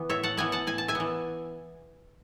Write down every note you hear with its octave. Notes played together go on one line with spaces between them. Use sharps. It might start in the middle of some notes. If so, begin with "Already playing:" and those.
Already playing: E3 B3
A2 C#5 E5
F#5 A5
E3 B3 E5 G#5
F#5 A5
A2 G#5
A5
E5 G#5
E3 B3